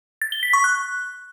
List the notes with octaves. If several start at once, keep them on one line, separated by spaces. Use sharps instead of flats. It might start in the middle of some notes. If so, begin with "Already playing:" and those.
A6
G7
B6
C#6
F#6